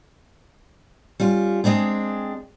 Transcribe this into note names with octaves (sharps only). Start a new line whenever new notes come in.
G3 C#4 F4
G#3 C4 D4 G#4